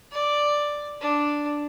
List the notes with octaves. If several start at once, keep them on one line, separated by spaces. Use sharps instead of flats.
D5
D4